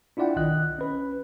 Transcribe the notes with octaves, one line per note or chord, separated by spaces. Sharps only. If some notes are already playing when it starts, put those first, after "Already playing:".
D4 E4 F4 D5 F#5 G5
B1 D#3 D#5 F#6
C#4 B4